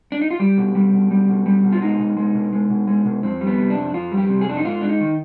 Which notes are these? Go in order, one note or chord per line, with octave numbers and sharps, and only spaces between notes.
D4
D#4
F4
G3 G4
B2
G3
B2
G3
B2
G3
B2
F4
G#3 D#4
B2
G#3
B2
G#3
B2
G#3
B2
F2 C4
G3
B3
C3
D4
F2
F2 F4
G3
G4
C3
G#4
F2 D4
D#4
G#2 F4
G#3 D4
D#4
D#3